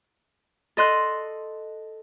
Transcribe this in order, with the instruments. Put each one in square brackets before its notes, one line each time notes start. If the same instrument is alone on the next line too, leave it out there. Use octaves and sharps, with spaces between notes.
[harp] A4 D#5 C6 F#6